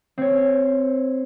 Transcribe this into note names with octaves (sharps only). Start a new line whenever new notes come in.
C4 C#5